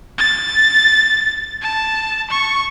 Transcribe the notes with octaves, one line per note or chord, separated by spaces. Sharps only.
A6
A5
C#6